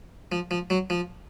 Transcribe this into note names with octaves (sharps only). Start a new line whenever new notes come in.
F3
F3
F#3
F3